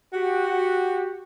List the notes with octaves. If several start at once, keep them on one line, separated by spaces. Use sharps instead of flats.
F#4 G4